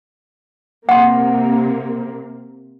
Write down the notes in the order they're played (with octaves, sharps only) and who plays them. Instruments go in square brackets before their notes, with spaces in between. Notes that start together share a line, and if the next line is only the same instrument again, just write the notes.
[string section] C3 A#3 [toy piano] F#5 C6